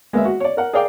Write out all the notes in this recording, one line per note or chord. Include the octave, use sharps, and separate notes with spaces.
G#3 A#3 B3 E5
F#4
C#5 D5
A#4 F#5
G#4 A#4 D5 F5 G5 D6